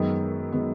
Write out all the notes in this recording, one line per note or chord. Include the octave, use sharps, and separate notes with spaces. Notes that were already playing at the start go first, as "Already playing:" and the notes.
Already playing: F#2 D#3 G#3 B3
D#3 G#3 B3